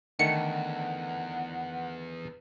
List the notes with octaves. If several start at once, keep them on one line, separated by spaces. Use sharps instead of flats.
E2 D3 D#3 A3 F#5 C#7